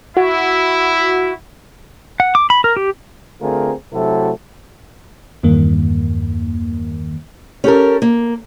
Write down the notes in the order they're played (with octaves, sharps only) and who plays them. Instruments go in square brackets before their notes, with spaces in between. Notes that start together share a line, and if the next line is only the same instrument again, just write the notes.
[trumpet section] E4 [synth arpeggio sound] F#4
[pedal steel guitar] F#5
D6
B5
A#4
G4
[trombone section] D3 A3 C4 F4 G#4 A#4
C3 F#3 A3 E4 F#4 A4
[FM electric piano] E2 G2 D#3 A#3
[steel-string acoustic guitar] C#4 G4 A4 A#4
A#3